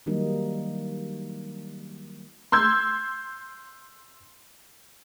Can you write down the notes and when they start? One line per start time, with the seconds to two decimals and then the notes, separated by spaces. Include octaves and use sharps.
0.06 D#3 F#3 G3 A#3 D#4
2.52 C6 E6 G6 G#6